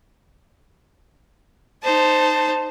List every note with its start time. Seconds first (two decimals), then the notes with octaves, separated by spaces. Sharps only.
1.83 D#4 C5 A5